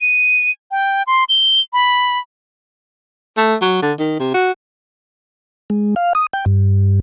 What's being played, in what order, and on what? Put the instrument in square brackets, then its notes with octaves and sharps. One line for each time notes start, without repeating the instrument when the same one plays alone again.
[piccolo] D#7
G5
C6
G7
B5
[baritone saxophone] A3
F#3
D3
D#3
C3
F#4
[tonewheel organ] G#3
F5
D#6
G5
G2